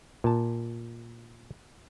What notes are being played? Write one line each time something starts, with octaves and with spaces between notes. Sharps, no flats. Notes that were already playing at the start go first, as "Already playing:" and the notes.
A#2 A5